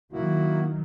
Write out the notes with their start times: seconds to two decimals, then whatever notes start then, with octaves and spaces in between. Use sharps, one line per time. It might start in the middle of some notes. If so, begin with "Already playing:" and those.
0.13 D#3 F#3 A#3 E4 F#4